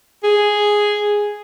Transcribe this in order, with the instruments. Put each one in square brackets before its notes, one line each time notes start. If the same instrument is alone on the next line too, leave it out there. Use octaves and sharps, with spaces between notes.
[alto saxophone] G#4